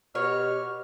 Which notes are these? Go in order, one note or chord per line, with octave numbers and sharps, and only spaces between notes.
B2 G4 C#5 F6